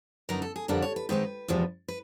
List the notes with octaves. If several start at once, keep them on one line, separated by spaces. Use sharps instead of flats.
F#2 D3 F#3 B3 D#4 A#4
A4
G#4
F2 D3 G3 B3 D4 A#4
C#5
B4
G#2 D#3 G#3 C4 D#4 B4
E2 C3 F3 G#3
B4